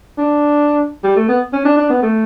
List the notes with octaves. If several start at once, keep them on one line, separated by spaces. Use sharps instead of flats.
D4
G3
A3
B3
C#4
D4
D4
B3
A3